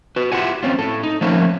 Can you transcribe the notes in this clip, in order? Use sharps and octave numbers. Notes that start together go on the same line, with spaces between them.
F#4 B4
E4 F4 G4 F#5 G#5
C4 C#4 F4
A2 A4
D#4
F3 A3 A#3 C4 C#4